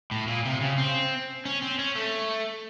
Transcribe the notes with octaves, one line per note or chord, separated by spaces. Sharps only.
A2
A#2
C3
C#3
C4
C#4
C4
C#4
A3